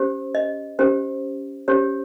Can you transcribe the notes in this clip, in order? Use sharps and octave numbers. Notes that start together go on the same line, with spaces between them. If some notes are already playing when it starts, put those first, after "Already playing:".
Already playing: C#4 G4 C5
D#5
C#4 G4 C5
C#4 G4 C5 C#5